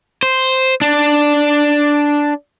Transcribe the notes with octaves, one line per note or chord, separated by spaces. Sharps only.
C5
D4